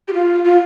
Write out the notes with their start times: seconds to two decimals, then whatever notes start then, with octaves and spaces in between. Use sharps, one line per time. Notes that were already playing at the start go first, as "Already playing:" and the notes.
0.08 G4
0.13 F4
0.45 F4